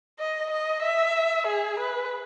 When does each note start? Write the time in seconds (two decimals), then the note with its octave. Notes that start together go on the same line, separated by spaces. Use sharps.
0.19 D#5
0.50 D#5
0.82 E5
1.47 G#4
1.79 B4